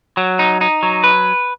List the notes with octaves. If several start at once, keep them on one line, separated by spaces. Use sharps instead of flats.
F#3
D#4
D#4
F#3
B4